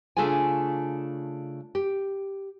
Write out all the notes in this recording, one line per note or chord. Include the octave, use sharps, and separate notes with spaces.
C#3 A3 D4 F4 G#4 G#5
G4